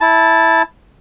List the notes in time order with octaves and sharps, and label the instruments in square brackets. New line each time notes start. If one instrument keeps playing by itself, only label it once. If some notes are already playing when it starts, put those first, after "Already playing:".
[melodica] E4 A5